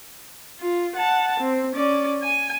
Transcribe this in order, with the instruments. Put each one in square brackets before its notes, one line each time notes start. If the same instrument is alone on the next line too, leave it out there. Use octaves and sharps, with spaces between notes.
[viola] F4
F#5 A5
C4
C#4 D5
G#5